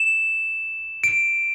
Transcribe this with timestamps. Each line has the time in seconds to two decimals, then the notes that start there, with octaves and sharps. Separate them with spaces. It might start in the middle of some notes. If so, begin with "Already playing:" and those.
Already playing: E7
1.04 D7